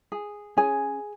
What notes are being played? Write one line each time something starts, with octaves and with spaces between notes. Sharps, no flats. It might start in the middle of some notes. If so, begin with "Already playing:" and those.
G#4
C#4 G#4 G#5